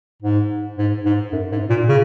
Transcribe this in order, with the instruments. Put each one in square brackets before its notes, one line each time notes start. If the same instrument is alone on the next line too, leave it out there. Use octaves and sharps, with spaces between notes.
[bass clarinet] G#2
G#2
G#2
F#2
G#2
A#2
C#3